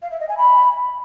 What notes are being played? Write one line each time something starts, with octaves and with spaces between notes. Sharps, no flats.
F5
E5
D#5
G#5
B5